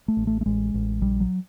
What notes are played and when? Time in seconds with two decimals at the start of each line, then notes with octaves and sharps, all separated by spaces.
0.08 A3
0.17 A1
0.27 A3
0.41 A3
0.46 A1 G#3
0.74 A1
1.02 A#1 G3
1.20 F#3